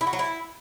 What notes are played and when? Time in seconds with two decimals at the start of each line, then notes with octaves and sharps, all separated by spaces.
0.01 E4
0.07 F#4
0.13 F#3
0.19 E4